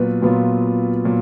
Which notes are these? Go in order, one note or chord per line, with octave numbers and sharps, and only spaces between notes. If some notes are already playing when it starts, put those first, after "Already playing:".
Already playing: A#2 F#3 B3 F4 B4
A#2 F#3 B3 F4
A#2 F#3